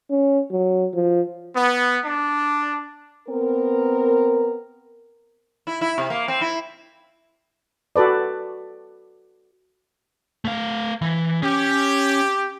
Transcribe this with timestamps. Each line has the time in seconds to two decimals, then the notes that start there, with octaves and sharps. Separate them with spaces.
0.10 C#4
0.51 F#3
0.94 F3
1.54 B3
2.05 D4
3.28 B3 C4 A#4
5.67 E4
5.81 E4
5.98 C3
6.10 A#3
6.28 C4
6.41 E4
7.96 F#4 A4 B4 D5
10.45 A3 F5
11.02 E3
11.42 C#4 G4